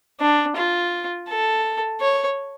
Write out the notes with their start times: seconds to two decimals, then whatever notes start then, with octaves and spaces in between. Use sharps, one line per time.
0.21 D4
0.57 F4
1.29 A4
2.01 C#5